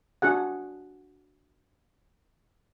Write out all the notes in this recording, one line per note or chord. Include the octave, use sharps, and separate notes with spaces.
D4 F#4 G#4 F#5